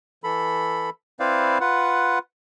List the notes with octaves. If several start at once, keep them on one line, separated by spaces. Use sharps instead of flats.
E3 A4 B5
C4 E4 B4 C5 D5 F5
F4 B4 F#5